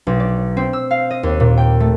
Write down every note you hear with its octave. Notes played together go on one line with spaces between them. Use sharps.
B1
D5
C4
E6
F5
D#5
D#2
A#2
G5
A3